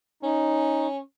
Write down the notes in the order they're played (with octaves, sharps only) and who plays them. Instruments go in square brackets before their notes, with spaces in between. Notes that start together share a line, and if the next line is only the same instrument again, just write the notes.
[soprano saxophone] C#4 [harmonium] D#4